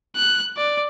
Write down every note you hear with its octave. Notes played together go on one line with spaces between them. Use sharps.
F#6
D5